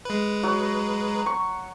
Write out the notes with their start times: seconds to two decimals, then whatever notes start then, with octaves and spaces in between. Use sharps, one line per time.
0.05 G#3 B4
0.43 F#3
1.26 C#6